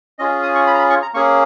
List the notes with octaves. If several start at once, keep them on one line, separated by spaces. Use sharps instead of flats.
C#4 F4 G#4 D#5
D#6
C#6
B5
A#5
B5
C#6
A#5
A#3 C#4 G#4 C#6